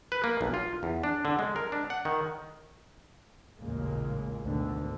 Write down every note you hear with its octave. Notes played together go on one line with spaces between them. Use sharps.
B4
A#3
B1
F4
E2
D4
D3
G#3
A#4
D4
F#5
D#3
A1 D#2 A#2 C#3 G#3 A#3
D2 G#2 B2 D3 D#3